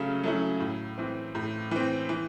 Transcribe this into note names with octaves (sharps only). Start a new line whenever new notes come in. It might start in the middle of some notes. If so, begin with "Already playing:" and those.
Already playing: C#3 F#3 A3 C#4
F#3 A3 C#4 E4
A2
E3 C4
A2
E3 C4
E3